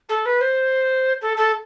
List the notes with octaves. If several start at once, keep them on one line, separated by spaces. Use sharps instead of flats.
A4
B4
C5
A4
A4